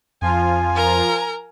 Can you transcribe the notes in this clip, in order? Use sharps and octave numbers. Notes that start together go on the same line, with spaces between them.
F2 F3 F4 G#5
A#4 A#5